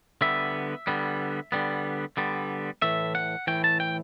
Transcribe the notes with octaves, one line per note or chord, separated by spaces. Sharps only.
D3 G3 B3 E5
D3 G3 B3
D3 G3 B3
D3 G3 B3
A2 E3 A3 E5
F#5
A2 E3 A3 G5
A5
G5